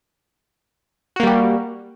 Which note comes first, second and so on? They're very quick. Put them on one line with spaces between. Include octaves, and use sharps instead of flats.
F#4 A#3 G3 G4